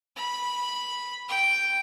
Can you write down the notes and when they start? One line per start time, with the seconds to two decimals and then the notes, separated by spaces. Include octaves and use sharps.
0.16 B5
1.28 G5